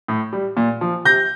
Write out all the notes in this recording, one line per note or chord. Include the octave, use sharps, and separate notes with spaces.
A2
G3
A#2
F3
C3 G6 A#6